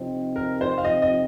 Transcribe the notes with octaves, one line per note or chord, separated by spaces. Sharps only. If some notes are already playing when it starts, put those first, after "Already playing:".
Already playing: C3 F3 C4 D#4
A#4
C5
F5
D#5
D#5